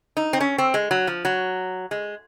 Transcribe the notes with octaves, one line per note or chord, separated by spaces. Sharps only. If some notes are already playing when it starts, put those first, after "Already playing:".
D#4
C4
C#4
C4
G#3
F#3
F3
F#3
G#3